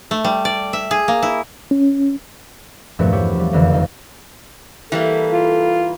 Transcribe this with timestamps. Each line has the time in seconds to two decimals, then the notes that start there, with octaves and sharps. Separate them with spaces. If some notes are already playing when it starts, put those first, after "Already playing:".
0.11 A3
0.24 G3
0.45 D5
0.73 E5
0.91 G#4
1.08 A#3
1.22 E4
1.71 C#4
2.99 E2 G2 A#2 F3 A3 B3
3.12 E4 G4 C#5 F#5
3.35 F3 G3
3.53 F#1 F2 D3 E3 F5
3.73 D#4 F5
4.92 E3 G3 A#3 A4
5.32 F4